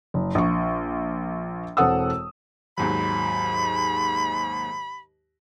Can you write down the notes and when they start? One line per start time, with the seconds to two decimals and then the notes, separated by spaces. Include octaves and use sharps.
0.14 F#1
0.35 A#1 C#6
1.77 E1 C4 A4 F#5 D#6 E6
2.78 D#2 G#2 F#3 B5